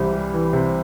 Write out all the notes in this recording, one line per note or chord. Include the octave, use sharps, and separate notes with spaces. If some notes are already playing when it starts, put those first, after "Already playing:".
Already playing: C2 C3 E3 G3
G3
E3
C3